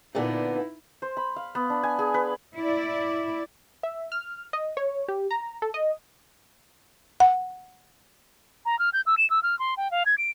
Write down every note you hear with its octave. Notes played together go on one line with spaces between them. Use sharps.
A#2 D3 B3 D#4 E4
C5
B5
F5
B3
D4
G#5
G#4
B4
E4 D5
E5
F6
D#5
C#5
G4
A#5
A4
D#5
F#5
A#5
F6
G6
E6
E7
E6
F6
C6
G5
F5
G#6
D7